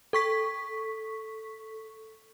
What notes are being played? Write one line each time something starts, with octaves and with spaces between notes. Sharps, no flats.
A4 C#6 B6